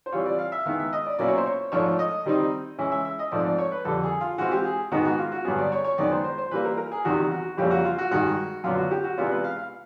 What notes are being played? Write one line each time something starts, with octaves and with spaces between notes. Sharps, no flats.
C5
E3 G3 C4 F4 C#5
D5
F5
E5
D#3 G#3 B3 E4 F5
E5
D#5
D5
B2 F#3 A#3 C#4 E4 D5
C#5
C5
C#5
G#2 F3 A3 D4 C#5
D#5
D#3 G3 C4 D#4
E3 G#3 C#4 E4 E5
E5
E5
D#5
G#2 F3 A3 C4 D5
D5
C#5
B4
F2 D3 G3 A4
G#4
F4
E3 G#3 C4 F4 F#4
G4
G#4
G#2 D#3 G#3 B3 D#4 F#4
F#4
F4
F#4
G2 D3 F#3 B3 G#4
D5
C#5
C#5
F#2 D#3 G#3 B3 D5
C5
C5
C5
E3 G3 A#3 B4
A#4
A#4
G#4
E2 C3 D#3 G3 F#4
F#4
F2 C#3 E3 G3 A#3 G4
F#4
F4
F#4
G2 D#3 G#3 F#4
F#2 D3 F#3 B3 F4
F#4
G4
F#4
C3 E3 G#3 B3 D4 F4
B4
F5
F5